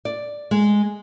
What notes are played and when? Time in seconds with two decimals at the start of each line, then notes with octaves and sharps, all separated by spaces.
0.05 D5
0.51 G#3